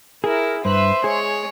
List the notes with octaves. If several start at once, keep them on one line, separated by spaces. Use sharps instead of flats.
E4 G#4 A#4
G2 B4 C5 E5 C6
G#3 G#4 C#5